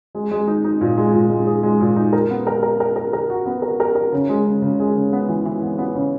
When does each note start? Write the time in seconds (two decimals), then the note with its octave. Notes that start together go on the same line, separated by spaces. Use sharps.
0.15 G#3
0.31 G#3
0.47 D#4
0.64 D#4
0.81 A#2
0.98 G#3
1.14 A#2
1.30 G#3
1.47 G#4
1.63 G#3
1.81 A#2
1.96 D#4
2.13 A#4
2.30 B3
2.47 A#4
2.63 A#4
2.80 A#4
2.96 A#4
3.13 A#4
3.30 F#4
3.46 B3
3.62 A#4
3.80 A#4
3.95 A#4
4.12 C#3
4.29 G#3
4.46 C#3
4.62 C#3
4.79 G#3
4.95 C#3
5.13 B3
5.28 E3
5.45 E3
5.63 B3
5.78 B3
5.95 C#3